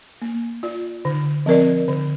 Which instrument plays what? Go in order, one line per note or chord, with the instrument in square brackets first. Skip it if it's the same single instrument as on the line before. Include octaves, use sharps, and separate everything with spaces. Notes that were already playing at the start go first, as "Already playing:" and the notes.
[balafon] A#3
F4 D5
D3
F3 C4 A#4 D5
D3